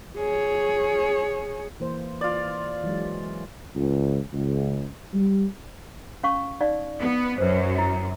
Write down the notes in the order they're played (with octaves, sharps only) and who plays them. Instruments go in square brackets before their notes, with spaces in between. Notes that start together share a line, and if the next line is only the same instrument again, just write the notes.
[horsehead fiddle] G#4 C#5
[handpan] E3 A#3 C5
[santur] F4 D5
[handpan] E3 F#3 G#3
[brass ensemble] C#2
C#2
G3
[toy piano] C#4 F5 C#6
D#4 D5 F5
[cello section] B3
[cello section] F#2 [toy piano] B4 C5
[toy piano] E4